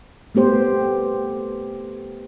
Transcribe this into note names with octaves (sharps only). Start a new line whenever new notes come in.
A3 B3 G4 C5